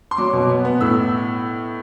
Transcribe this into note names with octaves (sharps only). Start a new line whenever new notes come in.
C6
F#3 D6
B2
B3
B3
A2 E6